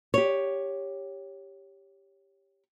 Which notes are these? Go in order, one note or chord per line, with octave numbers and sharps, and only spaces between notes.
G4 C#5